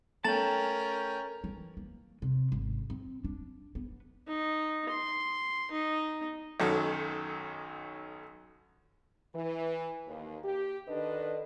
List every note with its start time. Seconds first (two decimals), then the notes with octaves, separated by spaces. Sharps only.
0.24 A3 C#4 A#4 G5 A5 A#5 A6 F#7
1.44 E3
1.77 A#3
2.22 C3
2.52 G#1
2.90 C4
3.24 D4
3.75 B3
4.28 D#4
4.90 C6
5.72 D#4
6.60 B1 F#2 D#3 F#3 A4
9.35 E3
10.06 D#2
10.44 G4
10.88 D3 D#3 D4 B4 D#5